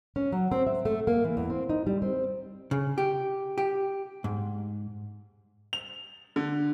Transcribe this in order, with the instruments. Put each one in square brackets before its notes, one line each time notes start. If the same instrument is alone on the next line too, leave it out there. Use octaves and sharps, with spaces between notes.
[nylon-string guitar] C#4
F#3
C4
E5
A3
A#3
E3
E2
C4
D#4
G3
C4
[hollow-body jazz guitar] C#3
G4
G4
G#2
[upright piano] F7
D3